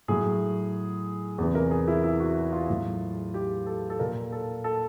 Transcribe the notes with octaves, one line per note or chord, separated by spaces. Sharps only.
A2 F#3 G#4
E2 C3 E3
A#4
G#4
E4
E4
F#4
F4
A2 F#3
G4
A4
A4
A#2 F3 A#4
A4
A4